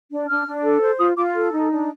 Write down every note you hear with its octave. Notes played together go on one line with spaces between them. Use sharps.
D4
D4 F6
D4
A4
C5
F4 D#6
F4 D6
A4
D#4
D4